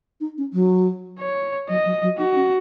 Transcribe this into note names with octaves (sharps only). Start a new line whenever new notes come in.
D#4
C#4
F#3
C#5
F#3 D#5
F#3
F#3
D#4 F#4
C#4